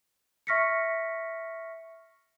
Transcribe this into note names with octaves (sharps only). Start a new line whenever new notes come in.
E5 C#6 F6 A#6 B6 C#7